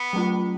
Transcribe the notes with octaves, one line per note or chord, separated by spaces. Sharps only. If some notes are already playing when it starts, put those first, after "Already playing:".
Already playing: B3
F#3 A3 C#4 F4